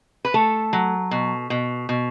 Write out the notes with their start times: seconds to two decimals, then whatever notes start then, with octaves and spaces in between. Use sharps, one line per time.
0.25 B4
0.34 A3 A4
0.73 F#3
1.11 B2
1.50 B2
1.89 B2